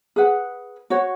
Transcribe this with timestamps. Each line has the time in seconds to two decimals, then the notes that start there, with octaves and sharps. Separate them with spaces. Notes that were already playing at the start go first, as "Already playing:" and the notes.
0.16 G#4 B4 F#5
0.90 F#4 C#5 F#5